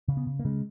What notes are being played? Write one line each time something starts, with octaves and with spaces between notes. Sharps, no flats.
C#3
B3
C#3
A#3
C#3 G#3